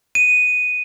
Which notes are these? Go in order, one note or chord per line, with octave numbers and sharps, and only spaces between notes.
D#7